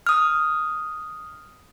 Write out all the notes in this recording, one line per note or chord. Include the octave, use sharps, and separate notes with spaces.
D#6 F6